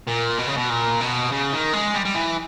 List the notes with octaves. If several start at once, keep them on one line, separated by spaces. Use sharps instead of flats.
A#2
B2
C#3
B2
A#2
B2
C#3
D#3
G#3
G3
G3
E3